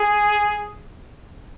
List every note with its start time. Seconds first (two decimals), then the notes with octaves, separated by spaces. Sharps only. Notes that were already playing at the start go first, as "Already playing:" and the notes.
Already playing: G#4